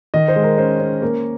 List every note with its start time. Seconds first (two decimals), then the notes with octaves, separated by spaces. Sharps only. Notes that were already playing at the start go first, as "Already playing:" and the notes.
0.14 D#3 D#5
0.28 C5
0.36 G#3
0.44 A#4
0.58 C#4 C5
0.80 C#4
1.02 A#3 A#4